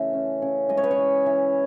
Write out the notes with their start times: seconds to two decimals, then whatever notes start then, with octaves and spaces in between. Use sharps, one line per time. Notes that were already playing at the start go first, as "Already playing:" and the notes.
Already playing: C#3 E3 A3 E5
0.13 C#4
0.42 C#3
0.69 G#3 D#5
0.77 C#5
0.84 B4
0.91 C#5
0.98 E3
1.26 E3